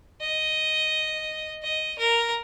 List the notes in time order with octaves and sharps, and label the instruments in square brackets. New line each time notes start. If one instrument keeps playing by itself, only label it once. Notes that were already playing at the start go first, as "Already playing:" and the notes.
[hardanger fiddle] D#5
D#5
A#4